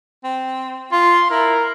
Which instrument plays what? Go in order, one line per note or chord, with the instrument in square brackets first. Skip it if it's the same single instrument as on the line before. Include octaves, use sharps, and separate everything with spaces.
[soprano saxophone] C4
[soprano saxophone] F4 [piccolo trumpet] C6
[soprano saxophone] E4 [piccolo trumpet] A#4